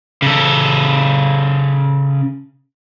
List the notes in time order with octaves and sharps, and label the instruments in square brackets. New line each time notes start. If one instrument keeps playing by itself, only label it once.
[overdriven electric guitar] C#3 A4